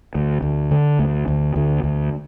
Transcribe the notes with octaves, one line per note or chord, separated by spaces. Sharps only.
D2
D2
D3
D2
D2
D2
D2